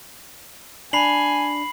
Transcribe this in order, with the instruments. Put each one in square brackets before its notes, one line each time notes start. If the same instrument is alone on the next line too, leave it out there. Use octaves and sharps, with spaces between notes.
[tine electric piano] D4 [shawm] G#5 [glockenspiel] B5 C7 F#7